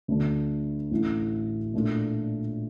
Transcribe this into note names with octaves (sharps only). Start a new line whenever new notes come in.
D2 D3 A3 D4
A1 A2 A3
A#2 A3 D4 F4